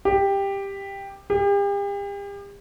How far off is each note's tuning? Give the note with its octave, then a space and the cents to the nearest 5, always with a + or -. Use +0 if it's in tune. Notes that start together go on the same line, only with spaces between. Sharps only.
G4 +10
G4 +40